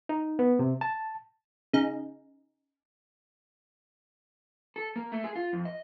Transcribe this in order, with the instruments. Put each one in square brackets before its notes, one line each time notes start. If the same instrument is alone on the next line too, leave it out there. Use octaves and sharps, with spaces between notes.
[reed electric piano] D#4
B3
C3
A5
[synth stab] C#3 D#4
[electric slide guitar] A4
A#3
A3
G#4
F4
F2
D#5